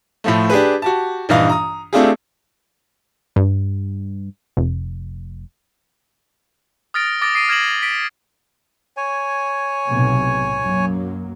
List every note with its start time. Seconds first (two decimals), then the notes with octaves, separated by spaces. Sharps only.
0.24 A2 F3 A3
0.50 D4 G4 G#4 B4
0.82 F#4 G4 A5
1.29 A#1 G2 E3 D#4 F5
1.50 A#5 D#6
1.93 A3 C4 D4 F4 G4 G#4
3.36 G2
4.57 F1
6.94 D#6 F6 A6 A#6 D7
7.22 D6 D#6 A6 A#6 D7
7.34 D#6 C7 D7 D#7
7.49 F6 G#6 A#6 E7 F#7
7.82 B6 D7
8.97 C#5 G#5
9.87 B1 A2 C3
10.63 F#2 F#3 A#3